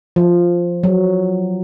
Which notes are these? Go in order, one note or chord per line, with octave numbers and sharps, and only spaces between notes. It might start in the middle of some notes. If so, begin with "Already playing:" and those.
F3
F#3